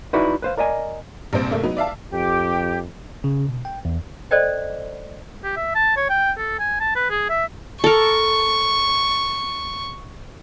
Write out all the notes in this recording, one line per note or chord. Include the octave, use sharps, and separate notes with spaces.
D#4 E4 F#4 B4 D5
B4 C5 F5
A#4 D5 D#5 G#5
A#1 G2 C3 C5 D7
C2 A3 A#3
F#3 B3 D#4 B4
D5 E5 F5 A5
F2 G4
C#3
B2
G5
E2
A4 C5 D5 D#5 G5
G4
E5
A5
C#5
G5
A4
G#5
A5
B4
G#4
E5
A4 A#4 C#6